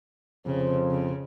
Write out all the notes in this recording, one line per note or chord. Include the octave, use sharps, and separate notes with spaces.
F2 C#3 C5
C#3